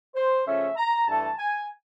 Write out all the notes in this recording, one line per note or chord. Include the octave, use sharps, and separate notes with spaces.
C5
C#3 F3 A3 C#4 E5
A#5
G2 E3 A3 A5
G#5